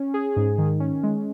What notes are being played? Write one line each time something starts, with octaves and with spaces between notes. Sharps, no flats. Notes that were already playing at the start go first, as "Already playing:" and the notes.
Already playing: C#4
G#4
G#2
D#3
C#4
G#3